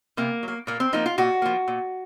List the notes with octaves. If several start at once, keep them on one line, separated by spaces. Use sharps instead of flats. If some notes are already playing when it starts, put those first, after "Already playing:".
C3 A#3
F#3 A#3
A#2 A#3
C4
F3 A#3 D#4
F4
A#2 F#4
F3 A#3
A#2